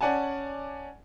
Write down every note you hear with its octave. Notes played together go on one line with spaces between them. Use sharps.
C#4 D5 F#5 G#5 A5